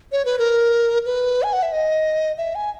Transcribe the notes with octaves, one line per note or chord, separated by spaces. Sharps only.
C#5
B4
A#4
B4
G#5
F#5
E5
D#5
E5
G#5